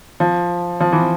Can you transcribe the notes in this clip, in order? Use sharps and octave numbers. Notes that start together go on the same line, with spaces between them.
F3
F3
E3